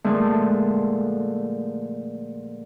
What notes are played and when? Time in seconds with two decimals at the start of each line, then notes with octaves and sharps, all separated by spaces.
0.04 A#2 D3 F3 G#3 A3